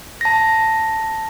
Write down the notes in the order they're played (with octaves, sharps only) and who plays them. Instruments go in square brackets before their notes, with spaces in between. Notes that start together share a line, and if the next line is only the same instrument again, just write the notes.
[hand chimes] A5 A#6